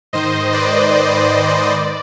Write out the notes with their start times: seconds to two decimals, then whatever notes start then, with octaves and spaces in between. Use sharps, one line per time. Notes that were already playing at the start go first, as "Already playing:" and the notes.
0.13 G#2 D#3 C5 D#5
0.52 B4 D5
0.93 C5
1.33 C5
1.72 D5